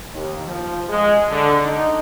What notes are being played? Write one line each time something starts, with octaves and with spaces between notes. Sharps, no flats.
D#2
F3
G#3
D3
D#4